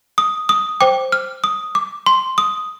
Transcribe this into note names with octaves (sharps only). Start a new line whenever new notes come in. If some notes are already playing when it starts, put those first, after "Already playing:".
D#6
D#6
C5 G5 D6
F6
D#6
D6
C6
D#6